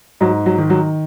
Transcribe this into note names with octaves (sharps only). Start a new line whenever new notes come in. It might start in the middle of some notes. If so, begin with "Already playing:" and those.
G#2 F#3
F#3
D#3
F#3